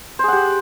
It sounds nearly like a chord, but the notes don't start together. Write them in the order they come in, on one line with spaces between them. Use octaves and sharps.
C5 G#4 F#5 G4